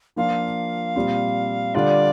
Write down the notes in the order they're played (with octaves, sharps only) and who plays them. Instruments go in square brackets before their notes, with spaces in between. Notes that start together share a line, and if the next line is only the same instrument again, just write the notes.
[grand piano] F3 A#3 D4 F4 [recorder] F5
[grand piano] A#2 G3 C4 F4
[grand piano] D3 G3 D4 F4 [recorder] D5